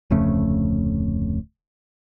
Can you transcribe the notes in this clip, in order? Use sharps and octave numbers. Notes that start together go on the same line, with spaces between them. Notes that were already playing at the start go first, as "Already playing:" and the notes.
D1 F2 C#3 A3